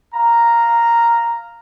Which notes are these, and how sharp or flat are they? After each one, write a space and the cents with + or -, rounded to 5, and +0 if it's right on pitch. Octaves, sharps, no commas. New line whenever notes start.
F5 +0 A#5 +0